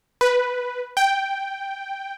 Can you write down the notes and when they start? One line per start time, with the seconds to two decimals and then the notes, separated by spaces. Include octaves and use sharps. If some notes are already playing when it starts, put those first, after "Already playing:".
0.21 B4
0.97 G5